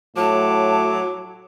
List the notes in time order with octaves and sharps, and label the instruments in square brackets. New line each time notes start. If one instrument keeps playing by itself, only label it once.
[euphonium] A2 [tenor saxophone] F#3 [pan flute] A5 [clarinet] D6